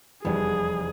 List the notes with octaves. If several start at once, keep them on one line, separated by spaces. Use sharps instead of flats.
F1 E2 E3 G3 B3 G#4